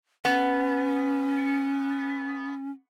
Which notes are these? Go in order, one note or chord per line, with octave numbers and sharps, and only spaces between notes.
B3 C#4